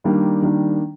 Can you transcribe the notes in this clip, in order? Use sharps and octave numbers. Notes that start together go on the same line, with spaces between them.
D#3 G3 A#3 D4
D#3 G3 A#3 D4